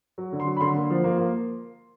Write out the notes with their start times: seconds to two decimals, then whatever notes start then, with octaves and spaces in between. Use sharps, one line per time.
0.18 F#3
0.33 D3
0.40 C6
0.47 F#3
0.57 B5
0.61 D3 C6
0.76 A#3
0.90 F3
1.04 A#3
1.18 A#3